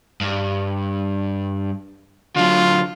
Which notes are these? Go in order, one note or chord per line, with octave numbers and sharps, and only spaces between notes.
G2
D3 F#3 F4